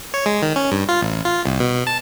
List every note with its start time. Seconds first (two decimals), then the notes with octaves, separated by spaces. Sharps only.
0.14 C#5
0.26 G#3
0.42 D#3
0.56 C#4
0.72 G2
0.89 F4
1.02 A1
1.25 F4
1.46 C2
1.60 B2
1.87 A5